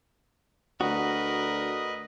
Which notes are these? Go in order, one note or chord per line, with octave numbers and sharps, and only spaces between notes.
D2 F#4 A#4 B4 D#5